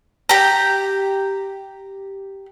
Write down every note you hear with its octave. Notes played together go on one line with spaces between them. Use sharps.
G4 A#5